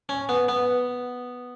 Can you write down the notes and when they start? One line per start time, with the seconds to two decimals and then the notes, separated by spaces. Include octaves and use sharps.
0.09 C#4
0.29 B3
0.48 B3